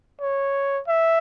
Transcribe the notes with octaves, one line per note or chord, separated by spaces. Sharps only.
C#5
E5